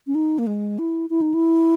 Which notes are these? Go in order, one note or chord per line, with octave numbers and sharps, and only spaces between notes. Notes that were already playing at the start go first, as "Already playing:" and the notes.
C#4
D#4
A#3
G#3
E4
E4
D#4
E4